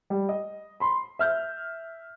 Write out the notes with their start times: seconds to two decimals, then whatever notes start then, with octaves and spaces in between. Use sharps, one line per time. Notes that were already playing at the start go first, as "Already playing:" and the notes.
0.10 G3
0.29 D#5
0.80 B5 C6
1.19 E5 F6 G6